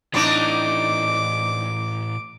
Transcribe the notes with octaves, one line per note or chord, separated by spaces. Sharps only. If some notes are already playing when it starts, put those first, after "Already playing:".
A2 E3 C4 D4 D#4 D6